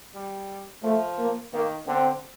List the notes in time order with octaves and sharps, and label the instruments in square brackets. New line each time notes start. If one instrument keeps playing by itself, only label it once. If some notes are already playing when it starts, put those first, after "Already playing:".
[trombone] G3
[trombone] F3 [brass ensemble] A3
[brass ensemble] A#3
[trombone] D#3 [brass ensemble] A#3
[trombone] D3 [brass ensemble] C4